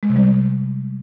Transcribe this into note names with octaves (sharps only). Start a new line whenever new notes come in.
G#3
C3
G3